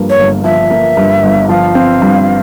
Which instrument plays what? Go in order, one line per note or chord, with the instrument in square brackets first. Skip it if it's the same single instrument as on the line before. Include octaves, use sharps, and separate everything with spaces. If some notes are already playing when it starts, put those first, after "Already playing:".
Already playing: [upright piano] G2 F3 A#3
[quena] C#5
[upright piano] G1
[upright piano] F3 [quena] E5
[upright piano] A#3
G2
G1
[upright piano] F3 [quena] F5
[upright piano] C4
G2